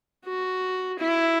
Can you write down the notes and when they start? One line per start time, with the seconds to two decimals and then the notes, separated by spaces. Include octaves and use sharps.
0.25 F#4
0.99 E4